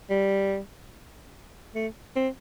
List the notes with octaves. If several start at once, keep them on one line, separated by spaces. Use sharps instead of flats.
G3
A3
C4